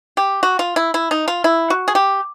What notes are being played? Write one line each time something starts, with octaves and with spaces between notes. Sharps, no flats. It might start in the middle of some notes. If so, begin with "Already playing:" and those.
G4
F#4
F4
E4
E4
D#4
F4
E4
F#4
G#4
G4